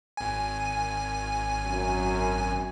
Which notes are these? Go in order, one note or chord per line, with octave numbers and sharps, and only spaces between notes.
G#1 G#5
F#2